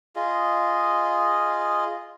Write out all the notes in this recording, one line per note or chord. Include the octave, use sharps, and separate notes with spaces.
F4 G#4 D#5